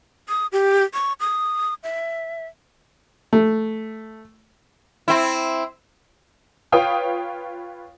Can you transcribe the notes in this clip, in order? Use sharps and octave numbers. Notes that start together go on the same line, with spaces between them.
D#6
G4
C#6
D#6
E5
A3
C4 E4
F4 B4 C#5 F5 G5 D#6